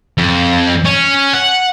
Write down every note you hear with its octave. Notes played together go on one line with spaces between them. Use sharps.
F2
C#4
F#5